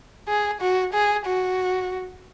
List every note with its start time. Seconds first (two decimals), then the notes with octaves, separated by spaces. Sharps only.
0.28 G#4
0.61 F#4
0.93 G#4
1.26 F#4